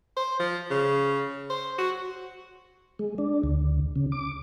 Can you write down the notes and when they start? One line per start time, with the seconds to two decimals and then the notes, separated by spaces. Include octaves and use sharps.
0.16 C5
0.39 F3
0.70 C#3
1.50 C5
1.78 F#4
2.99 G#3
3.18 D4
3.43 D2
3.96 C#3
4.12 D6